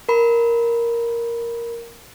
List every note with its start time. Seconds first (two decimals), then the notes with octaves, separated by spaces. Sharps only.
0.09 A#4 B5